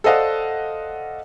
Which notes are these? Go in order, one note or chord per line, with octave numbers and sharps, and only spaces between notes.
A4 C5 D5 D#5 F5 F#5